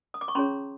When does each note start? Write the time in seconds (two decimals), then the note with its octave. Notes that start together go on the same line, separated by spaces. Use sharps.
0.14 D#6
0.21 D6
0.28 C#6
0.35 C#4 F4 G#4 C#5 A#5 C6